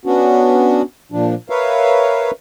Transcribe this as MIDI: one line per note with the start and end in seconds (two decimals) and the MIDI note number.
0.06 0.82 59
0.06 0.82 61
0.06 0.82 62
0.06 0.82 66
1.12 1.35 46
1.12 1.35 53
1.12 1.35 62
1.50 2.31 70
1.50 2.31 71
1.50 2.31 73
1.50 2.31 76
1.50 2.31 77